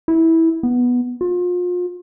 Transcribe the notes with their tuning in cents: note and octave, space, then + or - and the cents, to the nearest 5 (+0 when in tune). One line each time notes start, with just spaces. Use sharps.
E4 -15
B3 -5
F4 +35